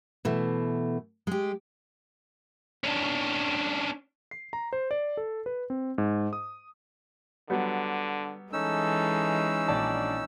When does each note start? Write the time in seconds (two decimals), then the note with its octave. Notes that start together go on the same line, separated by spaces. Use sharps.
0.25 B2 E3 A3
1.27 G#3 G4
2.84 C#4 D4
4.31 C7
4.53 A#5
4.73 C5
4.91 D5
5.17 A4
5.46 B4
5.70 C4
5.98 G#2
6.33 D#6
7.50 D3 F#3 G3 B3
8.53 E3 G#3 C#4 D#4 A4 E6
9.68 A#1 D4 D5 A5